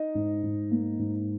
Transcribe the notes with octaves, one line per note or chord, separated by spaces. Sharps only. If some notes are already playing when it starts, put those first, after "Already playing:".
Already playing: D#4 D#5
G#2
G#2
A#3
G#2